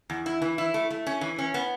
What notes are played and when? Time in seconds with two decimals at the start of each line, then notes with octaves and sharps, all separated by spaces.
0.10 E2
0.26 E4
0.42 E3
0.58 E4
0.74 A3
0.90 A3
1.07 C#4
1.21 E3
1.38 C#4
1.54 B3